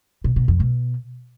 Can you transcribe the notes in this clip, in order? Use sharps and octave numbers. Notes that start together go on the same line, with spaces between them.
B2
B2
F2
B2